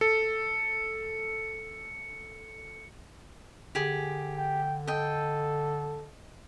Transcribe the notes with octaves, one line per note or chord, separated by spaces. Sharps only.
A4 C#7
D3 G4 G#4
G5
A4 D#5 G5